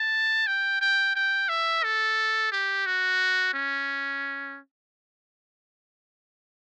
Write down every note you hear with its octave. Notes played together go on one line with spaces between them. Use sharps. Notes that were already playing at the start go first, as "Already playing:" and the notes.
Already playing: A5
G5
G5
G5
E5
A4
G4
F#4
C#4